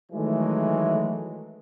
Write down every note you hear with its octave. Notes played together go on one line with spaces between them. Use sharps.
D#3 E3 F#3 G#3 A3